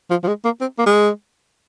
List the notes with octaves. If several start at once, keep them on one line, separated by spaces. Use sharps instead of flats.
F3
F3
G#3
A#3
C4
A#3
G#3